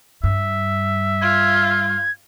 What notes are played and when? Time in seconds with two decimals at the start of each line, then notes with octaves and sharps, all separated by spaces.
0.24 G2 E5
1.22 F4 G#6